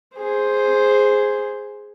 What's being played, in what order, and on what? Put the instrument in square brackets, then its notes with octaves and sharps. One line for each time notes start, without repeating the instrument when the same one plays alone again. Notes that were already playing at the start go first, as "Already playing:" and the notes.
[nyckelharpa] G#4 C5